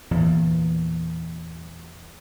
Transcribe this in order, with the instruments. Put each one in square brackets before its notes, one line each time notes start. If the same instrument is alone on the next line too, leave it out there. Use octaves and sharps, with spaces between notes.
[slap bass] E2 A#2 E3